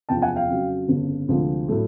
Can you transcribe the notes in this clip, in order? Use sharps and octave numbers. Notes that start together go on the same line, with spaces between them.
F#1 E2 C3 F3 G5 A5
F#5 G#5
F5 G5
F2 C#3 F#3
G1 F2 C#3
D2 C3 F3 G#3 C4
A2 F#3 A3